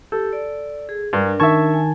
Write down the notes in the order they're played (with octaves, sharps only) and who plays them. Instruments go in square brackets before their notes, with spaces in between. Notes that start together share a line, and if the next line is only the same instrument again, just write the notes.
[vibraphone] G4 [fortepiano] A4
[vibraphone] D5
G#4
[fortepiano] G2 [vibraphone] D4 A#4
[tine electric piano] D#3 A5 G#6 [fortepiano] E5 C#6
[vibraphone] G#5